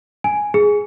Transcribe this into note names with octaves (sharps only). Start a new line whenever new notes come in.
G#5
G#4